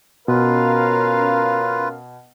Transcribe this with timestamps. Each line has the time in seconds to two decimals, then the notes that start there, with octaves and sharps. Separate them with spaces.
0.28 B2 C#4 F4 A#4 B4 F5